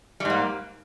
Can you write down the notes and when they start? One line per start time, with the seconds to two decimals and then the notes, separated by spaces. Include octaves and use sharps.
0.20 G3
0.25 G#2
0.30 A#3